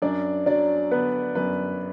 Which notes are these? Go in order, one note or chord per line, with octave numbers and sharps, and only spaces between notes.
F#2 D4 D5
F#3 D4 D5
D3 B3 B4
F#2 B3 B4